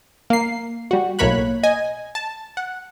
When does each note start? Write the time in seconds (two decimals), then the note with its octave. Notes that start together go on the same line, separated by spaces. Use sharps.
0.30 A#3 C7
0.91 G3 F#4
1.19 B1 A2 A#3 C#5 B5 F#6
1.63 D#5 G#5
2.15 A5
2.57 F#5